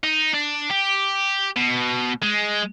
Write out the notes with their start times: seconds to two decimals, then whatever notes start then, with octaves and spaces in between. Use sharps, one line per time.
0.03 D#4
0.34 D4
0.71 G4
1.56 B2
2.22 G#3